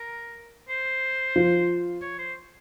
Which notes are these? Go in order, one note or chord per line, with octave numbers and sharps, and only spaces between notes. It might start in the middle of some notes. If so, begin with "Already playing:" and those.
Already playing: A#4
C5
F3 F4
C#5
C5